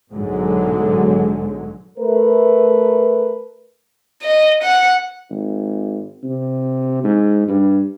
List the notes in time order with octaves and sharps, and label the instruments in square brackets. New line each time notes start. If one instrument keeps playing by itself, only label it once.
[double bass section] B1 G#2 D3 F#3 G#3
[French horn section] A3 A#4 B4
[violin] D#5
F#5
[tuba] G#1
C3
G#2
G2